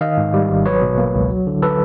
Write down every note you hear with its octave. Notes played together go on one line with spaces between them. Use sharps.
D#3 D#5 F5
G#2
G3
G#1
F#3 B4 C#5
B2
A#3
C#2
F#3
D3
A4 B4